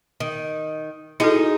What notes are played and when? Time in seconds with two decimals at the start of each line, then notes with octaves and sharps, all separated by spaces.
0.20 D#3
1.20 D#4 E4 F#4 G#4 A4